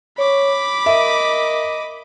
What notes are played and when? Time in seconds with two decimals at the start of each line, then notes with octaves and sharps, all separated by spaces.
0.19 C#5 B5 D6
0.86 A#4 D#5 E5